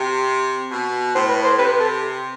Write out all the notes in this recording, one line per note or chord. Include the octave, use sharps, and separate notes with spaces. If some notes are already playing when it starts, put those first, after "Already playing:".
Already playing: C3
B2
A2 C5
B4
C5
C3 B4
A4